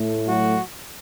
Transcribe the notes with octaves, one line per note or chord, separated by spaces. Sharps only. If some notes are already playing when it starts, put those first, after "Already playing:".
Already playing: A2 A3
F#3 F#4